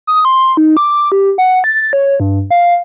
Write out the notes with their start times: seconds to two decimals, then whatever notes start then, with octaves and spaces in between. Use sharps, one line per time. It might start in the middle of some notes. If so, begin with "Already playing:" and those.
0.07 D#6
0.25 C6
0.57 D#4
0.77 D6
1.12 G4
1.38 F#5
1.64 A6
1.93 C#5
2.20 G2
2.51 F5